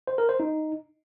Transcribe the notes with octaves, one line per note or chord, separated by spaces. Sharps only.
C5
A#4
C5
D#4